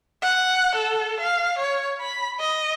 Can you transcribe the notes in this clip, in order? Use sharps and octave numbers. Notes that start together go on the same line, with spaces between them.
F#5
A4
F5
C#5
B5
D#5